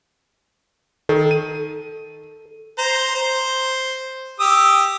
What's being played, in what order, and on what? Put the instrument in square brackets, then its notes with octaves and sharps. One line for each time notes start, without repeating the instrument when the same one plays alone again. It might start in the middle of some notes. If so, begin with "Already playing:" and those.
[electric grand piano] D#3 [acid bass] A4
[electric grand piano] D#7
[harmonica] C5 A#5
C5
G4 D#6 E6